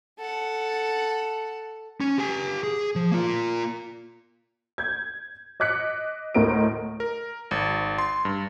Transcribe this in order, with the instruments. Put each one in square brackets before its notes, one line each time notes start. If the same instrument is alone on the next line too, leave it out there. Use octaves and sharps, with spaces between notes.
[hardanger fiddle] A4 F#5
[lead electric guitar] C#4
G4 G#5
G#4
F3
A#3 F4
[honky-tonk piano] G6 G#6
D#5 D6 F#6 B6 C#7
D2 A2 A#4 D#5 D7
[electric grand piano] A#4
G#1
C6
G2